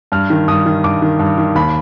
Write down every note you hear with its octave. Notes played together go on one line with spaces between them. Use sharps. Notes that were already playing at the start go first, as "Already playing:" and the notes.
G2 F6
D#3
G2 D#6
D#3
G2 D6
D#3
G2
D#3
D#2 B5